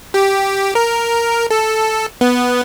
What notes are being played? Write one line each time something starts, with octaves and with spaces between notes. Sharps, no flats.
G4
A#4
A4
B3